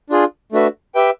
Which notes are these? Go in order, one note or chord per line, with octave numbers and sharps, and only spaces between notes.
D4 F4 G#4
A3 D4 F#4 B4 E5
G4 B4 E5 G5